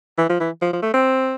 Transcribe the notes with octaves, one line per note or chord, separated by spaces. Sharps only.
E3
F3
E3
F3
F3
A3
C4